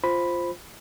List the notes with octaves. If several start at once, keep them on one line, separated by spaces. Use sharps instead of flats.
F4 C5 B5